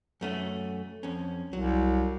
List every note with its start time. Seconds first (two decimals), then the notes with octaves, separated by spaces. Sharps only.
0.21 F#2 A3 C#4
1.03 F2 C#4
1.53 C2 F#3